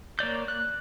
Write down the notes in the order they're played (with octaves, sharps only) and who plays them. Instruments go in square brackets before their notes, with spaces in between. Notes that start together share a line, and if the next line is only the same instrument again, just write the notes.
[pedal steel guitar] A#3 C#5 D5 G6
F#6